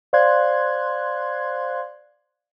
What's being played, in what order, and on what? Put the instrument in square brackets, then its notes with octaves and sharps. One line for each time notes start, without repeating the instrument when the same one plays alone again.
[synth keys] C5 D5 F5 C6 F#6 G#6